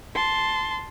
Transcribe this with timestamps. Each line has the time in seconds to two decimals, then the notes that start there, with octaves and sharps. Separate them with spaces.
0.15 A5 C6